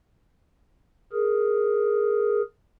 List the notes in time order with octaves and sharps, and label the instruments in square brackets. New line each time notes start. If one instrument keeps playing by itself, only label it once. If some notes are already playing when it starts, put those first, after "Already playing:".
[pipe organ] G#4 A#4